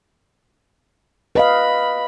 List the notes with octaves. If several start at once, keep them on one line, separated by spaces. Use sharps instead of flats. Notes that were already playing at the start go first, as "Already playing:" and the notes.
B4 D#5 F5 B5